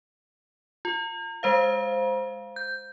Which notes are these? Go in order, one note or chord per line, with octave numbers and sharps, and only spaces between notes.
F4
G#3 C5 F5
G6